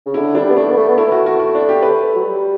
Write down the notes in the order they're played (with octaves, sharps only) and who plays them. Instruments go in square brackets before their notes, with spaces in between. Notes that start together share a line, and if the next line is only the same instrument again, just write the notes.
[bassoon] C#3
[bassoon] D3 [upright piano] E4
[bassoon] G3 [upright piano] D4
[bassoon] B3
[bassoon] A3 [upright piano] D4
[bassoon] B3
A3
B3
[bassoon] A3 [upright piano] E4
[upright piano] F#4
F#4
F#4
D4
G4
B4
[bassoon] F#3
G3